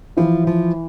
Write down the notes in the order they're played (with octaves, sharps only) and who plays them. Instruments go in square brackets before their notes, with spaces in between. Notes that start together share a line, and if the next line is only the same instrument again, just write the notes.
[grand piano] E3 E4 [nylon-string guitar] F3
[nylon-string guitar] F3